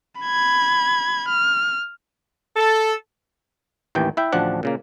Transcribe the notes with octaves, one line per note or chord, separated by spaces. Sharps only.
B5 G#6
F6
A4
A1 D#2 E3 G5
E4 E5 G5
A1 D2 F3 D4 F#5
A#2 C#3 A#3